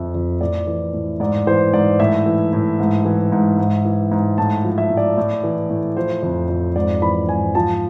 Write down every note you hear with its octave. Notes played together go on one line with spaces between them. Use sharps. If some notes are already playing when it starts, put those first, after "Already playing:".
Already playing: F2 F3 E5
F2
A2 D5
E3
A2
G#2 D5
E3 C5
G#2 D5
A2 E5
E3
A2
G#2
E3
G#2
G#2
E3
G#2
A2 A5
F3
E5
A2
D5
A2
E3
A2
F3 C5
F2
F2
G#2 D5
E3 B5
G#2 G#5
F3 A5